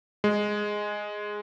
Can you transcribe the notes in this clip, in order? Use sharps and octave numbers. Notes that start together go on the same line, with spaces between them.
G#3